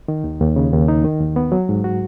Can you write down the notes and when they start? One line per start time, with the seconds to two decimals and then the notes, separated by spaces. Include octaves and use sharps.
0.08 D#3
0.24 D#2
0.40 D#2
0.56 C#3
0.73 D#2
0.88 D#4
1.04 D#3
1.21 D#2
1.36 B3
1.52 F#3
1.69 G#2
1.84 F#4